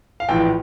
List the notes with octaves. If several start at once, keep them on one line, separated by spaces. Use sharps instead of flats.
F5
A#1 A2 E3 G5